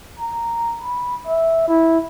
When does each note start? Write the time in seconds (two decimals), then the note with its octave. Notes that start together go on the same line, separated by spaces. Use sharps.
0.19 A#5
0.82 B5
1.27 E5
1.68 E4